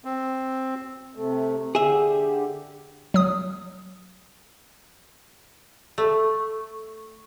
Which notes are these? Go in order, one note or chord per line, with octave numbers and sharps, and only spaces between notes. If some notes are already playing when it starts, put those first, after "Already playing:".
C4
C3 A3
D3 G4 G#4 E5
F#3 D#6
A3